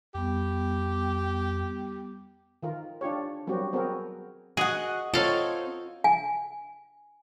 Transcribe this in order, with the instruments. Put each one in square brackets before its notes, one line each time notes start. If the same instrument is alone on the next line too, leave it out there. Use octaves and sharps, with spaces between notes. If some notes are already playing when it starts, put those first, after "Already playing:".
[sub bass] F2 [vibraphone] G3 B3 [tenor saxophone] G4
[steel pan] D#3 F4 A#4
D4 F4 G4 C#5
F#3 G3 A#3 C4 F#4 G4
B3 C4 F#4 G#4 A#4
[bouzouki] F#4 [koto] G#4 [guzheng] D#5 F#5
[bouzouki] C4 D#4 C#5 [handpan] F4 [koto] A4 F5
[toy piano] G#5